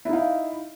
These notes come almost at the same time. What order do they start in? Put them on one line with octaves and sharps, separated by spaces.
E4 D#4 F5